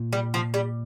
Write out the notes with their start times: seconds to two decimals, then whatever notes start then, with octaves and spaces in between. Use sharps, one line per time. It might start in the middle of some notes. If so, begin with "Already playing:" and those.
Already playing: A#2
0.13 G3
0.34 F3
0.54 G3